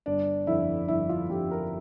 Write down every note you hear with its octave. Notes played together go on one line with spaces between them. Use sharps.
G1 D4
F2 D3 E4
G1 E4
F4
F2 D3 G4
A#4